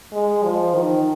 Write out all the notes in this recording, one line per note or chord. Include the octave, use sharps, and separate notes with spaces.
G#3
F3
D#3